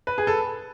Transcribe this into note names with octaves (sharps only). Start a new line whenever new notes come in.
B4
G#4
A4